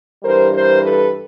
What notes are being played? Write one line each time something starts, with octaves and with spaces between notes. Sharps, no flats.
G2 E3 G3 A#4 C5
A#4 C5
A4 B4